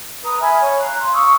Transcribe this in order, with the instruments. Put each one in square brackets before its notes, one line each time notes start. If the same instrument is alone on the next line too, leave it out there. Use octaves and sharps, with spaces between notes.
[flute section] B4 A#5 D#6
E5 G#5 B5 F6
C#5
F5 A#5 F#6
C6
F5 C#6 D#6 E6